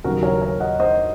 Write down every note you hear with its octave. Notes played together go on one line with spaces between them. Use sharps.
D#2 C#3 F#3 F#4 A#4
A#4 C#5
A#4 C#5
D#5 F#5
C5 D#5